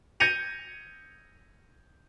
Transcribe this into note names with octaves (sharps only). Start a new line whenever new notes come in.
G6 G#6 A#6 C#7 D#7 F7